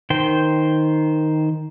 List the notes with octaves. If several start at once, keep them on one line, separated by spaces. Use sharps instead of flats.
D#3 C5 G5